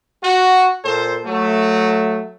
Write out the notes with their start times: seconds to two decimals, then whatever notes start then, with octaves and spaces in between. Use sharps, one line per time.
0.23 F#4
0.84 A#2 A4 C5
1.26 F#3 A3